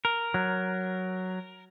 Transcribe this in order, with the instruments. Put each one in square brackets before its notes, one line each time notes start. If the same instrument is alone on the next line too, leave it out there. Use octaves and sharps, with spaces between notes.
[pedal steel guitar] A#4
[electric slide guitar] F#3